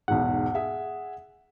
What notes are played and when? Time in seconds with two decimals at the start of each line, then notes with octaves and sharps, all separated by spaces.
0.08 B1 E2 G#2 F#5
0.54 G#4 E5